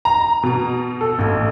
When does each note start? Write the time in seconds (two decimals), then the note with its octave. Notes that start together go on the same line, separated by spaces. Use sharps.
0.05 A#5
0.43 B2
1.01 A4
1.19 A1